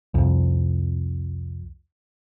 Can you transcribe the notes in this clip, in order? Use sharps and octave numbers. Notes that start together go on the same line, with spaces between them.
C2 F2